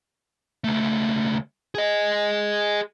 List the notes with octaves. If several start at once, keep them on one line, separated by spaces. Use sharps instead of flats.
C#2 A3
G#4 D#5